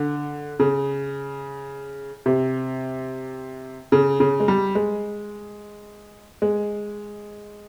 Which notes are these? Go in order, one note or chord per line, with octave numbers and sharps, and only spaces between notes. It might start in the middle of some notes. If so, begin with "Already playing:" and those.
Already playing: D3
C#3
C3
C#3
C#3
G#3
G3
G#3
G#3